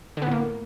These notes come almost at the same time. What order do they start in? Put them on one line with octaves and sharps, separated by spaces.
D3 B3 A2 A#3